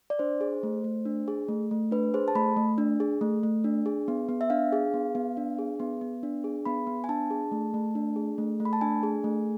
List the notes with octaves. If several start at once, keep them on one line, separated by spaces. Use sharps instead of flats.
D5
D4 C5
G#4
A3
A3
D4
G#4
A3
A3
D4 B4
G#4 C5
A5
A3 B5
A3
D4
G#4
A3
A3
D4
G#4
B3
B3
E5
D4 F5
G#4
B3
B3
D4
G#4
B3
B3
D4
G#4
B3 B5
B3
G#5
D4 A5
G#4
A3
A3
D4
G#4
A3
A3
B5
A5
D4 G#5
G#4
A3